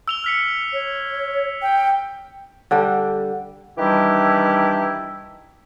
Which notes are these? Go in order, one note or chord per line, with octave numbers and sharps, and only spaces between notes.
E6 F7 G7
F6 B6 C#7
C#5
G5
D3 G3 D4 G4
D#3 E3 G3 D4 E4 G4